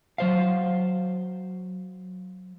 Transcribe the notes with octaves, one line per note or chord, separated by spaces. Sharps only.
F#3 C5 F5